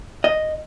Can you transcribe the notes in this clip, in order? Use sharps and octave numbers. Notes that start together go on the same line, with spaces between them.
D#5